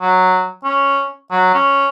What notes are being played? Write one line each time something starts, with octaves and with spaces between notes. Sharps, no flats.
F#3
C#4
F#3
C#4